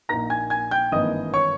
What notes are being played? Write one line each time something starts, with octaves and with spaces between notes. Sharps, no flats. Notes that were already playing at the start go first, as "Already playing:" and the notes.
A#1 A#2 A#3 D#4 A#5 A#6
G#5 G#6
G#5 G#6
G5 G6
G#1 G2 E3 A#3 D#5 D#6
C#5 C#6